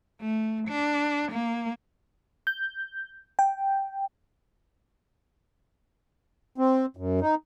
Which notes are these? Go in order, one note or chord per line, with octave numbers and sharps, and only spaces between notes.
A3
D4
A#3
G6
G5
C4
F#2
D#4